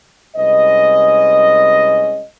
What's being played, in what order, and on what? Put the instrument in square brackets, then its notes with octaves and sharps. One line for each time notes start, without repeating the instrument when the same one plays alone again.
[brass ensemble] C2 G#3 C#4 B4 D#5